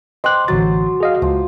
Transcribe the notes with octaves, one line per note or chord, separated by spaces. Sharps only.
C5 D#5 G5 D6 F#6
A1 D3 F#3 A6
G#4 D#5 F5
C#2 F3